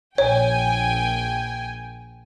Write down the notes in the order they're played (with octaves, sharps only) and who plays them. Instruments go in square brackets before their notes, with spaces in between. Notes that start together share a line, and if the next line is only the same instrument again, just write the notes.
[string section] A#1 G5 G#5 [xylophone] C#5